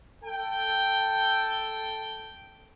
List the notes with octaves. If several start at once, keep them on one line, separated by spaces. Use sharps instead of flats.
A4 G5